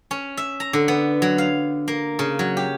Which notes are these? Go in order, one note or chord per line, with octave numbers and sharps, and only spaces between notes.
C#4
E5
A#5
D3
B3
F#3
F5
A#3
C#3
F#3
G4